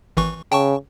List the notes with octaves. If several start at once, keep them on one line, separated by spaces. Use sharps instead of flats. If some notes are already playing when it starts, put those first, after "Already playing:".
G#1 E3 C#6
C#3 G5 A5 C#6